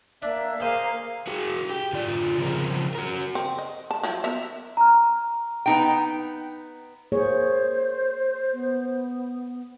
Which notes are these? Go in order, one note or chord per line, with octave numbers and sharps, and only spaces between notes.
A#3 D4 E5
A#3 G#4 C5 D#5 F5
F#4 G#4
G4 G5
D3 F4 D5
C#3 F3 C4 G#4 A#4
F#4 A#4
C4
D#5
A5
F3 F#3 E4
B3 A#4 E5
A#5 F6
B3 D#4 G5
A#3 G#4 C5 C#5
B3